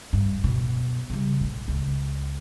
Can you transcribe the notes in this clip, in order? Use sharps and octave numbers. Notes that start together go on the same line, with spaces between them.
G2
F#2 B2
C#3 G3
A#1 A2
C#2